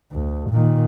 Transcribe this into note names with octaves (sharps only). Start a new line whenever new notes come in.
D2
A#2 D#3